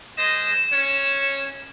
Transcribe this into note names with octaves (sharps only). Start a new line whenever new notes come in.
G#3 C5 D#5 E7
C#4 C#5